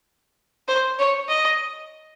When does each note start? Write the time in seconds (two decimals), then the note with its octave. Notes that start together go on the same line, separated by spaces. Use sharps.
0.68 C5
0.99 C#5
1.28 D#5